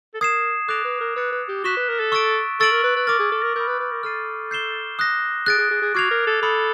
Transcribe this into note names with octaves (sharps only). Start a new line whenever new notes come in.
A4
A#4 D#6 G#6 C7 E7
A4 D6 F#6 A#6 D7 F7
B4
A#4
B4 E6 A6 C#7
B4
G4
F#4 F#6 B6 E7 G7
B4
A#4
A4
C#6 E6 A6 D7
A4 C#6 E6 A6 D7 F#7
A#4
B4
B4
A#4 D6 F6 A6
G#4
A4
A#4
A#4 B5 D#6 G6
B4
B4
A#4
A4 F6 A6 C7 D#7
G6 C7 E7 G7
D#6 F#6 A#6
G#4 F#6 A6 D7
G#4
G#4
G#4
F#4 D6 F6 G#6 C7 F7
A#4
A4
A4 B5 D#6 G#6 C#7